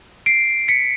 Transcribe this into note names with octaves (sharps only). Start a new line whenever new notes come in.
C7 D7
B6 C#7